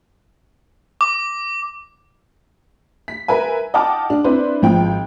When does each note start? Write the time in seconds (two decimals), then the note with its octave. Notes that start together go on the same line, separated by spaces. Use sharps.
1.01 D6
3.08 B6
3.28 A#4 B4 E5 G#5
3.74 D#5 F#5 G5 A5 D6 F6
4.10 D4
4.24 C4 D4 E4 B4 C5
4.62 G#1 F3 G5